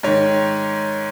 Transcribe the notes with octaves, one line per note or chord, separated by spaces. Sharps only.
G#2 D#3 C#5